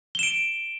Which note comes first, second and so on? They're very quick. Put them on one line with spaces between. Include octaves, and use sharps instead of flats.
G7 E7 D7